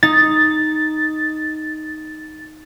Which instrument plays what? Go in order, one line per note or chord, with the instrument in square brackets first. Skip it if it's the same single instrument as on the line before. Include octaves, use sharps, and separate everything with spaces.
[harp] D#4 [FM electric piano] A6